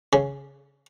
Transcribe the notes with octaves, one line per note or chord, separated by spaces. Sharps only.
C#3